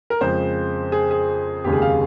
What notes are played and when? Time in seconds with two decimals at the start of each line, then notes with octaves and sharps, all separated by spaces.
0.10 A#4
0.21 F2 C#3 G#3 C5
0.92 G#4
1.11 G#4
1.64 F1 D#2 C#3 G#3 G4
1.73 G#4
1.82 F5